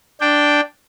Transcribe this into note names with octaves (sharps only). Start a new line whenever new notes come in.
D4 G5